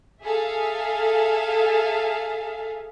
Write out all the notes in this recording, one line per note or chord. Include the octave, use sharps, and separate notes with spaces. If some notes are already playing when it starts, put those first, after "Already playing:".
G#4 A4 E5 F5